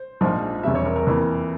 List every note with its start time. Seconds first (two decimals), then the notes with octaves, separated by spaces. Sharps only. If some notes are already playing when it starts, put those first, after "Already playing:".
Already playing: C5
0.21 A#1 G#2 F3
0.63 E1 E2 C3 G3 E5
0.75 C#5
0.86 A#4
0.96 A#4
1.06 F2 E3 A#3